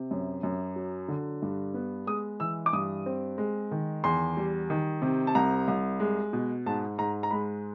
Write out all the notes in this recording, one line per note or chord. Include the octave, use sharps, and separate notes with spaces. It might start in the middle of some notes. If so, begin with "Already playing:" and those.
Already playing: C3
F#2
F#2
F#3
D3
G2
B3
G#3 D#6
E3 E6
D6
G2 D#6
C4
G#3
D#3
E2 C6
G3
D#3
C3
A5
C2 A#5
C2
G#3
B2
G#2 A5
G#2 A#5
A#5
G#3 B5